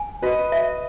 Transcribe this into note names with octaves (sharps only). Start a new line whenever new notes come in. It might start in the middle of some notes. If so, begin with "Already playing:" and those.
Already playing: G#5
F#4 B4 D#5
E5